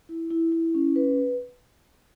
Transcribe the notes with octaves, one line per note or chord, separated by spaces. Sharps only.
E4
E4
E4
C#4
B4